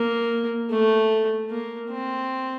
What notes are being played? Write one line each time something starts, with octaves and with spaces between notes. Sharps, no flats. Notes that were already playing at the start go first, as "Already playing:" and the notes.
Already playing: A#3
A3
A#3
C4